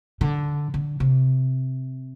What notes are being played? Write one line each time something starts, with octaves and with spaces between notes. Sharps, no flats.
D3
D3
C3